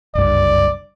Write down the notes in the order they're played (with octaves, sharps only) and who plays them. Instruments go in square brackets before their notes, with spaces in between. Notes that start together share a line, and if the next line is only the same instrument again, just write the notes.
[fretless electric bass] F#1 C2 G2 [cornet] D5